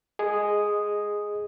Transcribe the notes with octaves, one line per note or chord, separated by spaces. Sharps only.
G#4 D#5 D#6